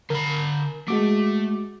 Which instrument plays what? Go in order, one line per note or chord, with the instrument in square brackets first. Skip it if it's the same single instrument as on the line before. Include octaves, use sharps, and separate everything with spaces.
[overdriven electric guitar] D3 B5 [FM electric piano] A#4
[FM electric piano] G#3 F#4 D6 [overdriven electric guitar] A3